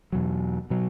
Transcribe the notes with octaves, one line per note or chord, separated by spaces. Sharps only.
E2 B2 F#3
B2 F#3